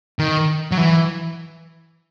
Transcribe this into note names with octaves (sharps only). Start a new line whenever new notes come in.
D#3
F#3
E3